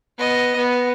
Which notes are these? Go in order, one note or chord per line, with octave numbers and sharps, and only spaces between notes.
B3 D#5
B3